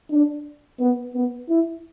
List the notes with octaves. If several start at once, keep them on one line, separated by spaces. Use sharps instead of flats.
D4
B3
B3
E4